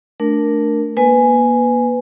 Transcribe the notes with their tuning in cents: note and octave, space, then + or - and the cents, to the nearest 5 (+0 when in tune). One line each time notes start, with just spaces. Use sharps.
A3 -5 D4 +0 A#4 +0
A#3 +35 B4 +20 G#5 +0